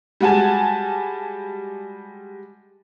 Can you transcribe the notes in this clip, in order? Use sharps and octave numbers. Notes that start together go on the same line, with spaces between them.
G3 G#3 F#4 G#5 A5